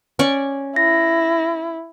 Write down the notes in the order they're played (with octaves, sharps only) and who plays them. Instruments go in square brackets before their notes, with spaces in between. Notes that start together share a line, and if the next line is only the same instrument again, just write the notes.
[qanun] C#4 D5 C#6
[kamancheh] E4 [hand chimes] A#6